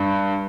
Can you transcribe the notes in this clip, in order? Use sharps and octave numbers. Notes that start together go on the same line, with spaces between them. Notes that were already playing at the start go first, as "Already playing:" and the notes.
Already playing: G2